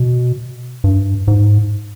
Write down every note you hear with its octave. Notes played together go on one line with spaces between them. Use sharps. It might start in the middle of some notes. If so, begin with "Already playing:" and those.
Already playing: B2
G2
G#2